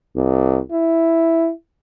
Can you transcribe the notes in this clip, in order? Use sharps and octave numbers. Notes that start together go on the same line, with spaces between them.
C2
E4